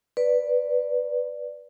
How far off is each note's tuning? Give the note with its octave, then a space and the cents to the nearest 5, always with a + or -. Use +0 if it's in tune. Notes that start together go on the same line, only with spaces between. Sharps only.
B4 +0 D5 +0